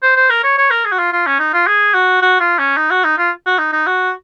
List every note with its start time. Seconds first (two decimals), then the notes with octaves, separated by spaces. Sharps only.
0.02 C5
0.16 C5
0.30 A#4
0.43 C#5
0.57 C#5
0.70 A#4
0.85 G#4
0.92 F#4
0.98 F4
1.12 F4
1.26 C#4
1.39 D#4
1.53 F4
1.67 G#4
1.94 F#4
2.22 F#4
2.40 F4
2.59 C#4
2.77 D#4
2.90 F#4
3.04 D#4
3.18 F4
3.46 F#4
3.58 D#4
3.72 D#4
3.86 F#4